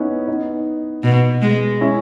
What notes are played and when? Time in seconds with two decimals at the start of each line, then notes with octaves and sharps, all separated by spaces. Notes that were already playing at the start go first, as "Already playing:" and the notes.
Already playing: B3 C#4 D#4 E4
0.28 B3 D#4
1.04 B2
1.42 G#3
1.81 C#4 E4